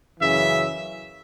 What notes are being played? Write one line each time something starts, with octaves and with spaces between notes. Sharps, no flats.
F#2 C#3 E3 E5